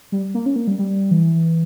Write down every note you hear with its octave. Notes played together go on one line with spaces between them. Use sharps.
G3
A#3
C#4
A#3
G3
G3
E3